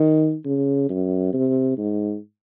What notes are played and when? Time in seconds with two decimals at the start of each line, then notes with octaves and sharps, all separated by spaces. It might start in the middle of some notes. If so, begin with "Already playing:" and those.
Already playing: D#3
0.45 C#3
0.89 F#2
1.33 C3
1.77 G#2